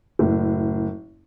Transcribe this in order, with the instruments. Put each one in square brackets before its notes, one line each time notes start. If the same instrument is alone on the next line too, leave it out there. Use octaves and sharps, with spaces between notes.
[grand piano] F#1 A2